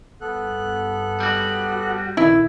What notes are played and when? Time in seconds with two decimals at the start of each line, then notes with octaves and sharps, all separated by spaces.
0.21 G1 B3 A4 F#6
1.20 G3 F#4
2.17 A#1 D3 D#3 E4 E6